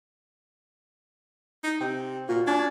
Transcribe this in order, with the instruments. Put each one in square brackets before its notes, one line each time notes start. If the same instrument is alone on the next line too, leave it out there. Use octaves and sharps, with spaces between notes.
[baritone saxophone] D#4
[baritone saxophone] C3 [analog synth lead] G5
[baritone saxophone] A#2 [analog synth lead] F4 [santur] F#4 F5
[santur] C#4 [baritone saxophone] D4 [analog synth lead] G#6